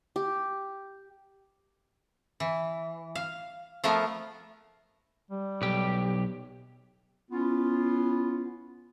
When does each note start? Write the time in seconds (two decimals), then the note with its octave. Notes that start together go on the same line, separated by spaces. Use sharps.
0.16 G4
2.40 E3
3.15 F5
3.84 F3 A3 B3 F4 A#4
5.31 G3
5.62 B1 G4
7.31 B3 C#4 E4 F4